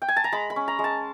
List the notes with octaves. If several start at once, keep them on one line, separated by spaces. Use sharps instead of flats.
G5
G#5
A5
A#5
G#3 B5
B5
C#4
A#5
G#3
A5